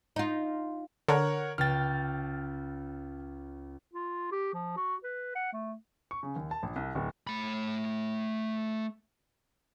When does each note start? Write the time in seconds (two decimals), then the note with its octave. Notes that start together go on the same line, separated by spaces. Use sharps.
0.16 D#4 F4
1.08 D3 A#4 C#5 F#5
1.58 C#2 G5 F6 A6
3.93 F4
4.32 G4
4.54 F3
4.77 F#4
5.04 B4
5.36 F#5
5.53 A3
6.11 C#6
6.23 C#3
6.36 D#2
6.51 A5
6.63 A#1
6.76 C2
6.95 D1
7.27 A3 B5